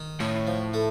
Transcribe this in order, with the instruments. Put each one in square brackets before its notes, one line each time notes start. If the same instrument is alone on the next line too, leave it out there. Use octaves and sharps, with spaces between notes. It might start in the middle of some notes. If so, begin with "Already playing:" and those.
Already playing: [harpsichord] D#3
[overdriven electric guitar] A2 [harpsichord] C#4
[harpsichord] F3
A3